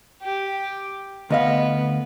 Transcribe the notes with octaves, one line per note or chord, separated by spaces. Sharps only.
G4
D2 B3 D#5 F5